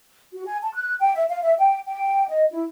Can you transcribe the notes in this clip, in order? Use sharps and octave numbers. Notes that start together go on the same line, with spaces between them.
F#4
G#5
A5
F#6
G5
E5
F5
E5
G5
G5
D#5
E4